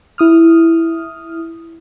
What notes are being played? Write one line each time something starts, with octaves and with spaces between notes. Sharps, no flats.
E4 D#6 F6